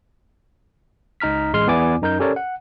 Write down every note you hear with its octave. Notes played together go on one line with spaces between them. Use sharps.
C#2 D#4 A#5 F6 B6
A1 G#3 C6 F6
E2 B3 E4 D5 G#5 D6
F#2 D#4 A#4 G6
C#4 G4 A4 A#4 C#5 D5
F#5